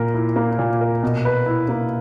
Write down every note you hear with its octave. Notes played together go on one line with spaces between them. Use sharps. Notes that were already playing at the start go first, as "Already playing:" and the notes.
Already playing: A#2 A#4
E4
A#3
A#2
A#4
B2
B4
E4
A#3